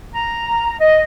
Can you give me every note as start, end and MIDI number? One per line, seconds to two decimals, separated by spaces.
0.12 0.75 82
0.79 1.00 75